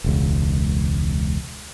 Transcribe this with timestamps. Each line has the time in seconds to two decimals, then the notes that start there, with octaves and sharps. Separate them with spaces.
0.04 E1 C#2